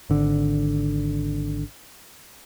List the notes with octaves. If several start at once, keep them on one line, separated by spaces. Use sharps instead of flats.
G#1 D3